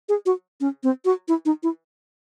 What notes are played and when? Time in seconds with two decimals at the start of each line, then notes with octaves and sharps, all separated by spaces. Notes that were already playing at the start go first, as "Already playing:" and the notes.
0.09 G#4
0.26 F#4
0.61 C#4
0.83 C4
1.05 F#4
1.28 E4
1.45 D#4
1.63 E4